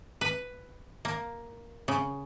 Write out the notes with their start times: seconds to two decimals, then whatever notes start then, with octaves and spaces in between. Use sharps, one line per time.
0.21 B4
1.05 A#3
1.88 C#3